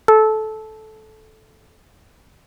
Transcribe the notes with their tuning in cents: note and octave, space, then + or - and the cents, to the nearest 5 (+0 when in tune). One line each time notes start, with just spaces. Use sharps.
A4 -15